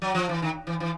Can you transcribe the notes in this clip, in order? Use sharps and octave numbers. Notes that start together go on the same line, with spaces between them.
F#3
F3
E3
D#3
E3
E3